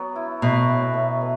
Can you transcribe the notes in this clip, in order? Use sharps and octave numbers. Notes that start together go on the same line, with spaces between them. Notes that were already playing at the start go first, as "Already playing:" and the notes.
Already playing: F#3 B3
E4
B2 A3
A2
A3
E3